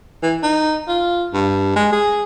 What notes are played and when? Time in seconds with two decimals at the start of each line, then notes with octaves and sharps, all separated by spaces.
0.23 E3
0.43 D#4
0.88 F4
1.34 G2
1.76 G#3
1.92 G#4